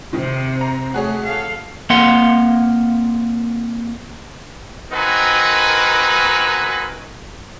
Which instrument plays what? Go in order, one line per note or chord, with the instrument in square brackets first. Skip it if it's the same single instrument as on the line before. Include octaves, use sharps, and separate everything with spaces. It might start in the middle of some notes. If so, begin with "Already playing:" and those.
[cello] C3 C4 [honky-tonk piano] D#3
[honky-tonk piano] A#5
[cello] A3 [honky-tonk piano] F#4 G#4 C#5
[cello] A4 F5
[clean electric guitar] A#3 C4 A#4 F5 F#5 C6
[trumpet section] C4 D#4 F#4 A#4 B4 G#5